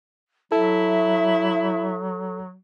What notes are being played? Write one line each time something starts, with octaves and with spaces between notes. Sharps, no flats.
F#3 E4 A4 E5